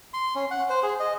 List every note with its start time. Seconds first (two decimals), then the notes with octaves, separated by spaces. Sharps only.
0.14 C6
0.35 C#4
0.51 F#5
0.70 C5
0.83 G#4
1.00 D#5